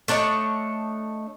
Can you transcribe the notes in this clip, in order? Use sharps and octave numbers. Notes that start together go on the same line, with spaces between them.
A3 D4 C#5 D#5